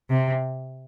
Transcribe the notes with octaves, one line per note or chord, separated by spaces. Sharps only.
C3